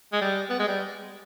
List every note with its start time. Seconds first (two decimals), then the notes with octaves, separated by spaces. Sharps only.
0.13 G#3
0.21 G3
0.50 B3
0.59 G#3
0.68 G3